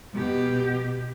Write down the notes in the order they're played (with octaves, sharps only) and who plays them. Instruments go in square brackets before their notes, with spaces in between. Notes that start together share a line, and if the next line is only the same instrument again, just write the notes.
[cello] B2 G4